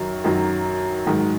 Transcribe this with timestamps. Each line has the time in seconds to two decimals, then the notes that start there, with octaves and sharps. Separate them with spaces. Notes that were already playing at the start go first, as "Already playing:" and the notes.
Already playing: F#2 D#3 F#3
0.24 F#2 D#3 F#3
1.06 G#2 D#3 F#3